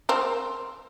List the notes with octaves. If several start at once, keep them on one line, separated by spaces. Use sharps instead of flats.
C4 A#4